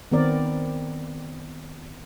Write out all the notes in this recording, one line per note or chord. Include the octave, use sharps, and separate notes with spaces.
D#3 B3 C4 A#4 D5